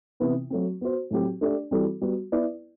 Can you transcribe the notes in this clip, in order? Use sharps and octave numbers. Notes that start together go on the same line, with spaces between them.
C3 E3 B3 E4
F#3 A3 C4
B3 F#4 C5
A2 F#3 C4 G4
A3 D4 G4 D5
E3 G3 C4 F#4 A4
G3 B3 F#4
B3 E4 B4 D5